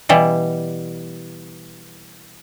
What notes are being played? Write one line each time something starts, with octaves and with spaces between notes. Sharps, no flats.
B2 E3 G3